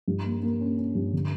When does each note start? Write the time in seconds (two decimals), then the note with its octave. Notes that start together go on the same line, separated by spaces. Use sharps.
0.08 G2
0.25 A#3
0.43 A#3
0.61 C#4
0.78 C#4
0.95 G2
1.13 D3